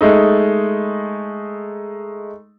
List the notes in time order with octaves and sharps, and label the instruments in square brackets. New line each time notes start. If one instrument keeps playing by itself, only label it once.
[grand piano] G#3 A3 D#4